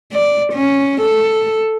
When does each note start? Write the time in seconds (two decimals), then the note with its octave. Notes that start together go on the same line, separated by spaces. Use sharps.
0.13 D5
0.53 C#4
1.01 A4